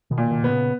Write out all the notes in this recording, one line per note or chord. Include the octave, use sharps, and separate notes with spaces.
B2 D#3
A#2
B2 D#3
B2 B3
A#2 C#3